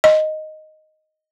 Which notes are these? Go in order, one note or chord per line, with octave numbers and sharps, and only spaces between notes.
D#5